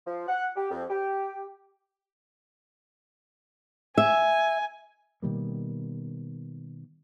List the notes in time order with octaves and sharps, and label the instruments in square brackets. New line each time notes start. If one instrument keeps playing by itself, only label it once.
[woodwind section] F3
F#5
G4
F2
G4
[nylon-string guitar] E5 [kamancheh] G#5
[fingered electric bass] B2 D#3 G3 A#3